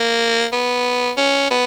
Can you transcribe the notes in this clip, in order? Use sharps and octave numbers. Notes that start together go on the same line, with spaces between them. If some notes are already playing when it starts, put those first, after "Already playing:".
Already playing: A#3
B3
C#4
B3